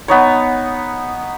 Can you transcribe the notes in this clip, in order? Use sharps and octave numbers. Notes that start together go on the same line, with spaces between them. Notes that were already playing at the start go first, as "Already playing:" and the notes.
B3 D#4 C#5